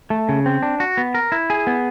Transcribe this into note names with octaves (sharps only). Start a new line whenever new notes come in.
A3
C#3
C4
D4
F#4
B3
A#4
E4
G#4
B3